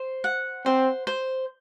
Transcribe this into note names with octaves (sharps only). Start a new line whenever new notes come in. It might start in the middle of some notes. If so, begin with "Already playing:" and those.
Already playing: C5
F#5
C4 C5
C5